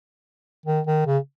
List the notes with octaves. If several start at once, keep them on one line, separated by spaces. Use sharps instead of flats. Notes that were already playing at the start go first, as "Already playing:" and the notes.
D#3
D#3
C#3